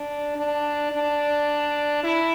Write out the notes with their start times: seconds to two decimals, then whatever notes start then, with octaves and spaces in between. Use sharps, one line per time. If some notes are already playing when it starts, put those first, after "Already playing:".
Already playing: D4
0.37 D4
0.92 D4
2.04 E4